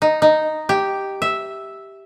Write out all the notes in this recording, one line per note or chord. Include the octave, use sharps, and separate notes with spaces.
D#4
D#4
G4
E5